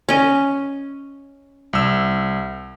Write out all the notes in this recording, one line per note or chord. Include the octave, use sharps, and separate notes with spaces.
C#4 D#5
C2 E6